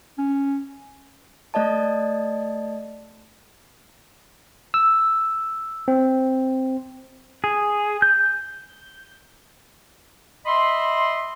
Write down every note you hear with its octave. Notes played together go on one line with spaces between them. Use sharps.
C#4
A3 D5 D#5 A5
E6
C4
G#4
G6
D#5 E5 B5 C6